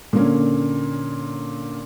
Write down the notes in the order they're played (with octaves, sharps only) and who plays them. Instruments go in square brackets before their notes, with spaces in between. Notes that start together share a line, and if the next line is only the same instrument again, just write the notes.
[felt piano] A#2 D3 A#3 C#4